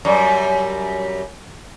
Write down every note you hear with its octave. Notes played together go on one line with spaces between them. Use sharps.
F#2 G3